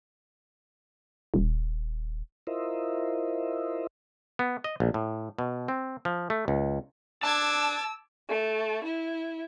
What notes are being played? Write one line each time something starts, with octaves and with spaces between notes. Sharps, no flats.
D#1
E4 F4 A#4 C5 D#5 E5
B3
D#5
A#1
A2
B2
C4
F3
A3
C#2
D4 A5 D6 E6 G#6
A3
E4